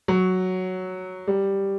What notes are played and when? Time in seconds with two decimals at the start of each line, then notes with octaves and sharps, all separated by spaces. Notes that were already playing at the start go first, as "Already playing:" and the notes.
0.08 F#3
1.27 G3